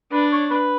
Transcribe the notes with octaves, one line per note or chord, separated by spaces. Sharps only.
D4 B4
C#5
B4